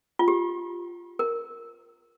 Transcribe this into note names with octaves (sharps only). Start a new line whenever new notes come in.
F4
G4
A#4